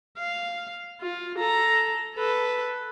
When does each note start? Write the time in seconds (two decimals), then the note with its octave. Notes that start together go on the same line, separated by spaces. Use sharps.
0.18 F5
1.01 F4
1.38 A4 A#5
2.16 A4 B4